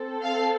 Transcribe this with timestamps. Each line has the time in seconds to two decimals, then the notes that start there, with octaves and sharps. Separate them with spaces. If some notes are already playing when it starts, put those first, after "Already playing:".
Already playing: C4 A4
0.23 F5